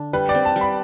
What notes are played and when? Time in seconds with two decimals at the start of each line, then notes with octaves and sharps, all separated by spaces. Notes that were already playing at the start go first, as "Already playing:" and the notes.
Already playing: D3 D4
0.13 G3 B4
0.29 D5
0.35 C4
0.45 A5
0.56 G3
0.61 B5